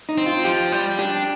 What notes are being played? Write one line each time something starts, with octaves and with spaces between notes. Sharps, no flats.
D#4
C4
F4
F3 G4
G3
D4 G4